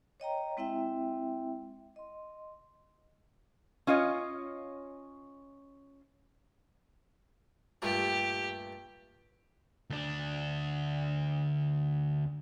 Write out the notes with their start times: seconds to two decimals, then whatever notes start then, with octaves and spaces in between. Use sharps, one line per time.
0.20 C#5 D#5 G5 A#5
0.57 G#3 C4 E4 E5 G5
1.96 D#5 C6
3.87 C#4 F4 C#5 D#5
7.82 G2 A#2 A3 G4
9.90 D2 D4